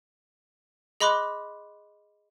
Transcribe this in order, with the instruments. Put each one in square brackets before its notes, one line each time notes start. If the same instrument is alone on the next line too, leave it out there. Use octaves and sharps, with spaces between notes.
[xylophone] G#4 D#5 B5 C6 D6 F#6